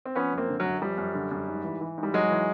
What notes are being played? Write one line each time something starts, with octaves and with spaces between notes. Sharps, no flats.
C4
F3 B3 C#4
F#2
A#3 C4
D3
F#3
F#2
F3 G3
F#2
D3
F#2
G#2
E3
E3
G#2
G3
G#2 F#3 G#3
E3